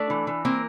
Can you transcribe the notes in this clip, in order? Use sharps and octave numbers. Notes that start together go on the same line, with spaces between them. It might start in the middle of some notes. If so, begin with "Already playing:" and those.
Already playing: A3 D4 D5
E3
E3
A#3 C4 A#4